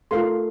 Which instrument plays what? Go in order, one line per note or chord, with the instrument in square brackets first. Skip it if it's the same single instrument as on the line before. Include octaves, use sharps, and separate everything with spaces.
[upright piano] A3 [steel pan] F4 A#4 F5 C6